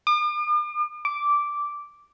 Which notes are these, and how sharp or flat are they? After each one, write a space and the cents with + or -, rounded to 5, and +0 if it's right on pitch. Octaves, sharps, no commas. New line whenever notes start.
D6 +45
D6 -10